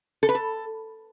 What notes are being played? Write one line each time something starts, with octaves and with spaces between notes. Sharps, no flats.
A4
B4
A4